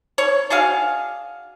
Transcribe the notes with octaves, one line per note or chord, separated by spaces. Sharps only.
C#5
D4 F#4 G#4 F5